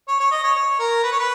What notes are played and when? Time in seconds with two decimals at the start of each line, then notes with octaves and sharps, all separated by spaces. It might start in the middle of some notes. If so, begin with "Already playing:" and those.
0.08 C#5
0.20 C#5
0.31 D#5
0.43 C#5
0.55 C#5
0.79 A#4
1.03 B4
1.12 C#5
1.19 B4